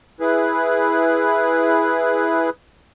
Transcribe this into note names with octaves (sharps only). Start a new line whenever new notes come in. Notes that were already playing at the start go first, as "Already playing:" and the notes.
E4 G#4 B4